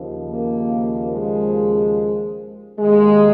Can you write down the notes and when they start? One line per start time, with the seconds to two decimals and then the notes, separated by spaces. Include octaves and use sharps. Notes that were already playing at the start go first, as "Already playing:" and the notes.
Already playing: D#2 C#3 F3
0.30 A#3
1.13 G#3
2.79 D#2 D#3 G#3